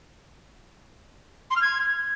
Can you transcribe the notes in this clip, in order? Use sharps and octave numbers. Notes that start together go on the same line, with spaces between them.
C6
F6
G#6